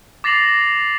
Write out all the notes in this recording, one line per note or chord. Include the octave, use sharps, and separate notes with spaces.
D6 A6 A#6 C7 F7 F#7